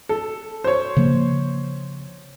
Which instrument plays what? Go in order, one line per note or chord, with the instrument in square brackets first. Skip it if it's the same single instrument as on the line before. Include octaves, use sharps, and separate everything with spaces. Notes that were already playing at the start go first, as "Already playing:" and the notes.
[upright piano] A4
C5 C#5
[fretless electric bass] C#3 F3 A#3